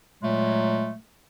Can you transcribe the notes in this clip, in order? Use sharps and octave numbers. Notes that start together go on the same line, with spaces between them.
A#2 F#3 G#3 A3